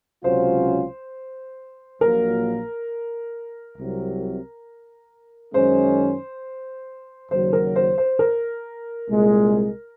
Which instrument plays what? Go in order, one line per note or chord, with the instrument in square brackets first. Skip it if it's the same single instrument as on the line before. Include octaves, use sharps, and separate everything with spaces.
[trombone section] C#2 C3 F#3 C#4 F4 [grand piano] C5
[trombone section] A#1 A#2 F#3 A#3 [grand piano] A#4
[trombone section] C2 C3 F#3
[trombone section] F#2 D#3 G#3 C#4 [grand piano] C5
[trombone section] D#2 C#3 F#3 [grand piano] C5
[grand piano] A#4
C5
C5
A#4
[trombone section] C2 A#2 G#3